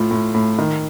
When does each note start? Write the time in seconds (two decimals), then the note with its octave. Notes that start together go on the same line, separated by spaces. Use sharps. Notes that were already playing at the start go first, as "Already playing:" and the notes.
Already playing: A2 F4
0.11 A2
0.34 A2
0.59 D#3